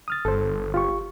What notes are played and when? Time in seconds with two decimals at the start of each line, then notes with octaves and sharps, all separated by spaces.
0.08 D#6 F6 A6
0.25 G1 A4 C5
0.74 F4 G4 C#6